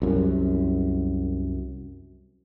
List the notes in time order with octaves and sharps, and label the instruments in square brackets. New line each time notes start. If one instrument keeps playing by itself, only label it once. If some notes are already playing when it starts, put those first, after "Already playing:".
[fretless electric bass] C2 F#2